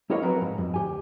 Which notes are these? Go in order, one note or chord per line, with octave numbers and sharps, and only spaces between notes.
E4 G4 A#4 C#5 D#5 F5
F3 F#3 C4 F#4 A#4 B4
G#2
F2
D2 G4 G#5